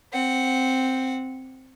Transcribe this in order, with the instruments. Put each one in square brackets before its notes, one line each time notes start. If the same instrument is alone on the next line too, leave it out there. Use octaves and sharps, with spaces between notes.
[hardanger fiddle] C4 F#5